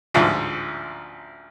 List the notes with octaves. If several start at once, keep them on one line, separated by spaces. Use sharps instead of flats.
A1 D2 G#2 F3